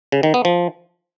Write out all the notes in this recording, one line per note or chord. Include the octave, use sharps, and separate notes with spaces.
C#3
D#3
B3
F3